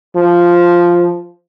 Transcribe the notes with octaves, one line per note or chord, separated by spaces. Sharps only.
F3